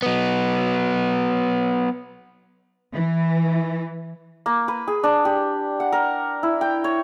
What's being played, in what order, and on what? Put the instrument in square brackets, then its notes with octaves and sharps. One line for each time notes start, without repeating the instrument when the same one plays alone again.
[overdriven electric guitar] F#3 B3
[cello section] E3
[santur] A#3
B4
G#4
D4
G4
F#5
A#4
E4
G5
C#5